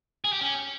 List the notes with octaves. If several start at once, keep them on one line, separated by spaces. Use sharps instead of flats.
G#4
G4
C#4